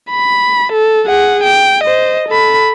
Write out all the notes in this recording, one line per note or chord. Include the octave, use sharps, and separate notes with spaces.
B5
A4
G#4 F#5
G5
C5 D#5
A4 B5